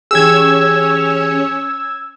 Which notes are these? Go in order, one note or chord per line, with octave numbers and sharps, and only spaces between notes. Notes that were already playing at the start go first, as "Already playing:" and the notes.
E3 C#4 G4 G#4 C#5 E6 G#6